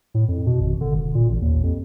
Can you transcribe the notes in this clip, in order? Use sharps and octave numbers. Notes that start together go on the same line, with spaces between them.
A2
F2
B2
G#1
D3
E1
A#2
A1
D#2
F2